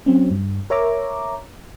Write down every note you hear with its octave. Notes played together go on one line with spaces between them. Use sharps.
F#3 C4 C#4
G2
A#4 C#5 E5 A#5 D6